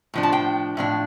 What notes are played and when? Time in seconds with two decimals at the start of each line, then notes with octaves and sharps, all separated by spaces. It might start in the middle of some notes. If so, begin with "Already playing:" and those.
0.14 A2 F3 D4
0.23 A5
0.32 G5
0.77 A2 F3 D4